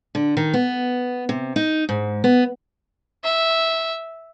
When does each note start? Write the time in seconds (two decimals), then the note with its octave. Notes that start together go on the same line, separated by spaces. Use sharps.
0.15 D3
0.37 D#3
0.54 B3
1.29 C3
1.56 D#4
1.89 G#2
2.24 B3
3.24 E5